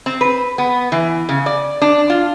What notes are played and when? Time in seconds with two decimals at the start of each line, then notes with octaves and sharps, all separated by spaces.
0.06 C4
0.21 B4
0.58 B3
0.92 E3
1.29 C#3
1.46 D5
1.82 D4
2.10 F4